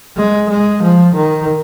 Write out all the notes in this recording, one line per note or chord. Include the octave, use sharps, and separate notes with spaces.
G#3
G#3
F3
D#3